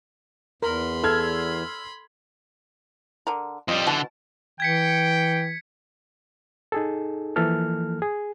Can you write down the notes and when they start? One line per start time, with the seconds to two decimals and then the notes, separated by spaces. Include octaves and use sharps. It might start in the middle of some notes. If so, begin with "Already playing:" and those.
0.62 E2 A#4 B5 C6
1.04 A4 E6 F6 G#6
3.27 D3 A#4
3.68 F2 G3 F4 D#5
3.87 B2 D3 E3 A5
4.60 E3 G5 G#6 B6 C#7
6.72 D#4 G#4 A4
7.36 E3 F3 A#3 A4 F6
8.02 G#4